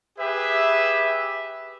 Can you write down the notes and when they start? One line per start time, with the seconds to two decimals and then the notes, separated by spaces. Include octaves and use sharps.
0.18 G4 G#4 B4 E5